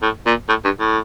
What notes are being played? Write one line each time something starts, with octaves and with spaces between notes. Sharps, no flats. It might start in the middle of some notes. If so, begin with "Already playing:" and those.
A2
A#2
A2
G2
A2